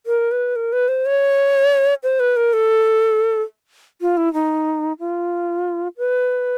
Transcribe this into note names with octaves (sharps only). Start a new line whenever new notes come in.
A#4
B4
A#4
B4
C5
C#5
C5
B4
A#4
A4
F4
E4
D#4
F4
B4